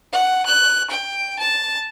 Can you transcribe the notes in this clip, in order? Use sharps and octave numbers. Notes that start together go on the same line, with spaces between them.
F#5
F#6
G5
A5